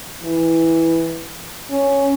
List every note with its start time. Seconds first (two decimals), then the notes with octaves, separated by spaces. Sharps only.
0.22 E3
1.70 C#4